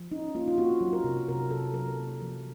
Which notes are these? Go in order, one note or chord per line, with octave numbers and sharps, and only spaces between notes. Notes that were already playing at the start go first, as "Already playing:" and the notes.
Already playing: F3
C#4 D#4
A#3 F4
F4
C4 F#4
F#3
A#4
C3
C3 A#4
C4 A4
F#3 A#4
A#3
F3